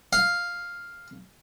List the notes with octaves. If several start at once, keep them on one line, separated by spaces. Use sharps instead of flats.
F5